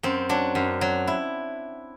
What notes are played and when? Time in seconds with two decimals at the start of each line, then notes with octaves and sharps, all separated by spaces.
0.03 F#2 C4
0.29 F#3 D4
0.55 F#2
0.81 F#3
1.07 E4